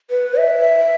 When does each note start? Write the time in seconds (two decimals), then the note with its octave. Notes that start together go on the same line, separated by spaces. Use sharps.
0.10 B4
0.38 E5